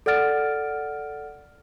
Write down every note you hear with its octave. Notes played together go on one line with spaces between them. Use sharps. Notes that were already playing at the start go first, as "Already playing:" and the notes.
A4 D5 F#5 F6 A6 D7